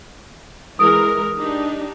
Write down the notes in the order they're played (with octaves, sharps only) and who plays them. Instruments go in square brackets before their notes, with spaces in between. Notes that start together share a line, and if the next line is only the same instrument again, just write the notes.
[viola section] E3 G#3 A#4 [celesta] D#6 D7
[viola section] D4 D#4 G4